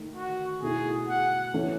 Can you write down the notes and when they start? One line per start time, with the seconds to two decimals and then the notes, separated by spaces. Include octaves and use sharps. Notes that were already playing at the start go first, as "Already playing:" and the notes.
Already playing: D#3 A3 D#4
0.16 F#4
0.62 B2 A3 E4 G#4
1.08 F#5
1.54 E3 A3 C#4